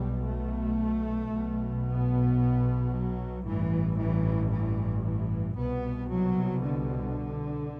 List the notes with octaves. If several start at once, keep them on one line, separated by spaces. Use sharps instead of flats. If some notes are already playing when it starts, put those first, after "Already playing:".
Already playing: B1 B2 G3
A3
B1 B2
B3
F#3
A1 G2 E3
E3
E3
E3
C2 B2 B3
F#3
D3